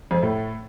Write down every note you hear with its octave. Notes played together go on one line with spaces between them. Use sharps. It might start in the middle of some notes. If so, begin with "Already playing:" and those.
F2 F3
A2 A3